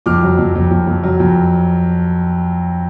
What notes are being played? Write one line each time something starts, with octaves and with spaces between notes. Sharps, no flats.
F2 D6 F6
F#3
F2
F2
F2
F2
F#3
F2